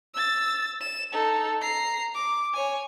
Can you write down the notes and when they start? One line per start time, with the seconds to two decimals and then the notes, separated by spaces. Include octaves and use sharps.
0.15 E6 A6
0.81 E7
1.12 D#4 A4
1.62 A#5 C7
2.15 D6
2.54 C#5 G#5